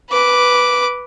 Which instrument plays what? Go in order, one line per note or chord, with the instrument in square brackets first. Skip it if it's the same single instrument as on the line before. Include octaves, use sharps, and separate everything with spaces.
[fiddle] B4 D6